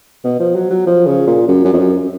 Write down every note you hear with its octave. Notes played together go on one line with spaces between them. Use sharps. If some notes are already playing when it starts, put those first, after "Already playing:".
B2
F3
F#3
F#3
F3
C#3
A#2
F#2
F#2
F2
F#2